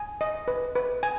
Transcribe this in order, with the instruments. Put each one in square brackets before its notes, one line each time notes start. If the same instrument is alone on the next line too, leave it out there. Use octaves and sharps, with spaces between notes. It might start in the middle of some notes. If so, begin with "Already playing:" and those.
Already playing: [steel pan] G#5
D#5
B4
B4
G#5